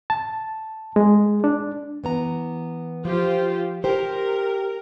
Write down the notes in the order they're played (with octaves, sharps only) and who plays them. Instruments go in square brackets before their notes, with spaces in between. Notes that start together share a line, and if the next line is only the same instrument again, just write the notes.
[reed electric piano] A5
G#3
D4
[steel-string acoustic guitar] E3 B3 A#5
[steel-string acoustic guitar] F3 [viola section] F4 G4 C5
[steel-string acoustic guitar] G4 C5 [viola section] A#4